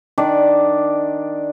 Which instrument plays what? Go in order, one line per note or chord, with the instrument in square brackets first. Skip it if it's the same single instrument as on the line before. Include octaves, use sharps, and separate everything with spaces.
[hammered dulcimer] D#3 D4 D5